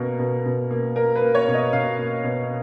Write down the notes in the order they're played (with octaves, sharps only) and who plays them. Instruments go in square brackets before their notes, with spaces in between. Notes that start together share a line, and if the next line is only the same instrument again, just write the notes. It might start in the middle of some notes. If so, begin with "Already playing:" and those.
Already playing: [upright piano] B2 A#3 A#4
B2
B2
A#3
A#3 A#4
B4
A#3
C#5
B2
D#5
B2 F5
A#3
B2